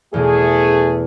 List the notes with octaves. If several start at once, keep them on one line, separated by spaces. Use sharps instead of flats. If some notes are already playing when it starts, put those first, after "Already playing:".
E2 B2 A3 G#4